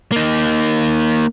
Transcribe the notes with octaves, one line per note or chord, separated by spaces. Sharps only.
A#3 D#4